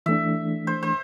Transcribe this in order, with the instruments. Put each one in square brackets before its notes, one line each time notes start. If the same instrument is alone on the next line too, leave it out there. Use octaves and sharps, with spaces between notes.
[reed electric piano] E3 A3 D4 [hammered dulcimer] E5
[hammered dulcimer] C5
C5